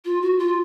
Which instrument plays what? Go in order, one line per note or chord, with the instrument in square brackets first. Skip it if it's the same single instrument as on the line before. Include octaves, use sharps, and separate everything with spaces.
[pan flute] F4
F#4
F4